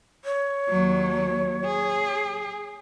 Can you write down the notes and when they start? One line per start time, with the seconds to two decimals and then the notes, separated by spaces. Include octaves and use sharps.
0.25 C#5
0.69 D#2 F#3
1.65 G#4